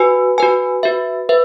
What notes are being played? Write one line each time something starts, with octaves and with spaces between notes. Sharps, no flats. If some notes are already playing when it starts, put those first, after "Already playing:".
Already playing: F#4 B4 G#5
F#4 B4 G#5
F#4 B4 E5
B4 E5